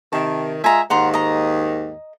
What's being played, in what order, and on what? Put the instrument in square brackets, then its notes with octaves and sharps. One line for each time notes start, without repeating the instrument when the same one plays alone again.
[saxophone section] C3 D#3 [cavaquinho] A5
[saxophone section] G#3 F4 E5 [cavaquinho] G#5 A#5
[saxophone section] D#2 G#2 D#3 [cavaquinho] F#5 A#5 C6
[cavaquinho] D#5 A#5